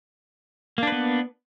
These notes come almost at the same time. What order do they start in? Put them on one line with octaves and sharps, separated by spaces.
A#3 D4 B4 B3